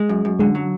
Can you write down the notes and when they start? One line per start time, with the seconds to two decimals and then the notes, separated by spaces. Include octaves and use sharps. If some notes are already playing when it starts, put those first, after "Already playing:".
Already playing: G#3
0.09 F#2
0.25 F#2
0.39 D3 G#3
0.55 F#3